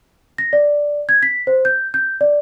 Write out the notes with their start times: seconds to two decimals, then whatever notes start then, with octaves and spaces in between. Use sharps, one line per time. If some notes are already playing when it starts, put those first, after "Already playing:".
0.38 A#6
0.53 D5
1.09 G#6
1.23 B6
1.47 C5
1.65 G6
1.94 G6
2.21 D5